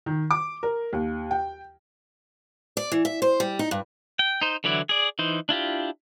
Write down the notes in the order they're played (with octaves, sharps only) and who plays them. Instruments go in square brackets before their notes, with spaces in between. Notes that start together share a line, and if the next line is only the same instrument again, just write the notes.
[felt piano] D#3
D6
A#4
D#2
G5
[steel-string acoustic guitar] D5
E3
E5
C5
G3
D#4
G2
[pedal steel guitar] G5
D#4 C5
D3 E3 F#3 E4 D5
G#4 D5
E3 D#4 C5
D4 E4 F4 G4